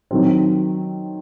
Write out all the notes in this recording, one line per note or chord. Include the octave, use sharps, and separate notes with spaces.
D#3 F#3 C4